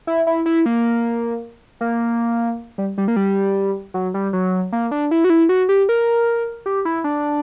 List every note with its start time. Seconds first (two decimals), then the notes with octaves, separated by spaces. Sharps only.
0.07 E4
0.27 E4
0.46 E4
0.66 A#3
1.81 A#3
2.78 G3
2.98 G3
3.08 A#3
3.16 G3
3.94 F#3
4.14 G3
4.33 F#3
4.72 A#3
4.91 D4
5.11 E4
5.24 F#4
5.30 E4
5.49 F#4
5.69 G4
5.89 A#4
6.66 G4
6.85 E4
7.04 D4